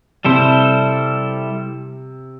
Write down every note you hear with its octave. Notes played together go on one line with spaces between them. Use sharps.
C3 G3 E4 A4 C5